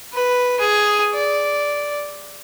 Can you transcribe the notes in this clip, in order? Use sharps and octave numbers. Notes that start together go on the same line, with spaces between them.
B4
G#4
D5